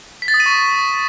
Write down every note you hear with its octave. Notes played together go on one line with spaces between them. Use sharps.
B6
A6
D#6
D#7
C#6